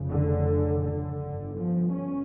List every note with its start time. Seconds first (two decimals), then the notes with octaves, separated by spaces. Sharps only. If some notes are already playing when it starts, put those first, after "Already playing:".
Already playing: F1 F2 C#3
0.09 D3
0.84 D3
1.21 G1 G2
1.56 F3
1.93 C#4